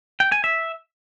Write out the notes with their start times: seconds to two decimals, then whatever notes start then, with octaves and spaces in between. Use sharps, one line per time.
0.20 G5
0.32 G#5
0.44 E5